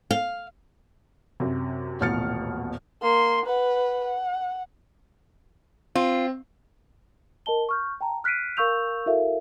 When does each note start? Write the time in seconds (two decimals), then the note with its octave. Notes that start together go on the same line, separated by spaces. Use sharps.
0.11 F5
1.40 F#2 C3
2.00 D#1 A1 B2 F6 A6 C#7
3.02 A#3 C6
3.45 B4 F#5
4.04 F#5
5.95 C4 F4
7.46 A#4 D#5 A5 G7
7.69 C#6 F6 G6
8.01 G5 A5 A#5
8.24 F6 F#6 B6 C7 D7 D#7
8.57 A#4 F5 C#6 E6 G6 F7
9.06 E4 F#4 A4 A#4 E5 F5